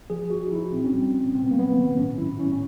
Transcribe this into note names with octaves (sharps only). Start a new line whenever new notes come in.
F3 G#4
F3 F#4
D#4
F3 E4
A#2 C4
C#4
G3 C4
A#2
C3 C4
B3
A#3
F#3 B3
D#3
A2 C#4
A2 E4
A2 C#4
C#4